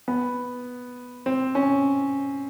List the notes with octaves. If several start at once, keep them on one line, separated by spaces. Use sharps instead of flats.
B3
C4
C#4